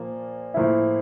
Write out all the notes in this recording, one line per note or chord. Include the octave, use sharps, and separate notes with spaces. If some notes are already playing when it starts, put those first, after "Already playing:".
Already playing: A#2 F3 A#3
A2 F3 A#3 E4